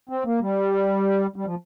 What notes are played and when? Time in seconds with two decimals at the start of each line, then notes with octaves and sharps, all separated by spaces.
0.09 C4
0.25 A#3
0.41 G3
1.36 G3
1.46 F3